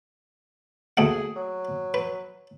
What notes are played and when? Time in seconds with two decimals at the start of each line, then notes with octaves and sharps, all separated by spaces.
0.97 D2 A3 G#4 F#5
1.36 F#3
1.94 B4